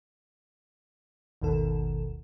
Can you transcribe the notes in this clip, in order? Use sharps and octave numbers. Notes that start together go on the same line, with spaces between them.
G#1 D#2 B2 D#3 A4